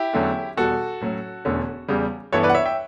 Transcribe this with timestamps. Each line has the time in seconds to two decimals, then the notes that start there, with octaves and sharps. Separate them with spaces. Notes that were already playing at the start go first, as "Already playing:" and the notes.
Already playing: E4 G4
0.13 E2 D3 F#3 A3 C#4
0.57 E2 B2 G3 F#4 A4
1.01 A2 F#3 C#4
1.45 E1 E2 D3 A3 C#4
1.88 E2 C#3 G3
2.32 G2 E3 B3 E4 A4 C#5
2.43 B4 D5
2.50 F#5
2.55 C#5 E5
2.65 E5 G5